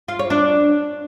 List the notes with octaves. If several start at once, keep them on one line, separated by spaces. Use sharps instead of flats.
F4
C#5
D4